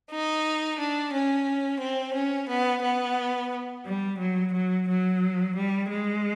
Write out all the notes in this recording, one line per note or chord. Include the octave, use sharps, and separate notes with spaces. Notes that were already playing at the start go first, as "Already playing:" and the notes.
D#4
D4
C#4
C4
C#4
B3
B3
G3
F#3
F#3
F#3
G3
G#3